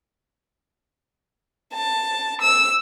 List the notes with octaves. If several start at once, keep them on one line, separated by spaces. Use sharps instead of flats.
A5
E6